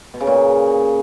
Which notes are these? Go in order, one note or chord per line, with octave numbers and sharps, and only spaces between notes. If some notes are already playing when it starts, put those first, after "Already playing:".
B2
C#3
A#2